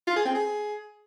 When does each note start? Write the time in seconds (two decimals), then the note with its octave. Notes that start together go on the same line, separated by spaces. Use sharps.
0.07 F4
0.16 G#4
0.25 C4
0.35 G#4